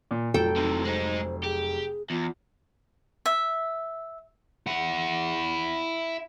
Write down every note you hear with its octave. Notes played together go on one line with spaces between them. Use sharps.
A#2
F1 F#3 F4 A4 G5
C3 E3 D#4
G#3 D#4 C5
G4 G#4
E2 F4
E5
E4 F#5